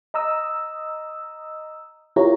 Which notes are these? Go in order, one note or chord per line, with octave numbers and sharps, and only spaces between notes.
D#5 A#5 D#6 E6
E4 F4 G4 A#4 C#5 A#5